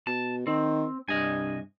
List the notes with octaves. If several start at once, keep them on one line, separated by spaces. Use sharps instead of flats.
B2 A5
D#3 C4
C2 G2 D#5 G#5